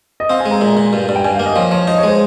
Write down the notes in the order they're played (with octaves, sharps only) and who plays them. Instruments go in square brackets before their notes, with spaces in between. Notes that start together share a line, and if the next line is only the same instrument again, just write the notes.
[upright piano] D#5
[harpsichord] C4 [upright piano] F5
[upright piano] G#5
[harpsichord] G#3
[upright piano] A#5
[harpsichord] A#2
A#2
G2
G2
[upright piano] G5
[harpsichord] G2 [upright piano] G#5
[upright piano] F5
[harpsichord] A#3
[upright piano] D#5
[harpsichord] F3 [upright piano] C#5
[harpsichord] F3 [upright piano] C#5
[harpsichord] D#4 [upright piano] D#5
[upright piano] C#5
[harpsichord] G#3 [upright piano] C5